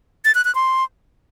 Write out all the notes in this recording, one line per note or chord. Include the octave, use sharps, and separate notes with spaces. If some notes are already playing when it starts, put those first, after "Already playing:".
A6
F#6
F#6
C6